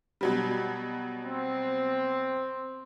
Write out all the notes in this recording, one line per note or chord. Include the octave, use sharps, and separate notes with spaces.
B2 F#3 G3
C4